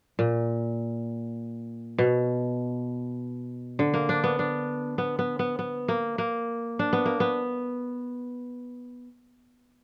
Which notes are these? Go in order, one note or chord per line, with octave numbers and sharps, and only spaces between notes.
A#2
B2
D3
A#3
D4
B3
D4
B3
B3
B3
B3
A#3
A#3
D4
B3
A#3
B3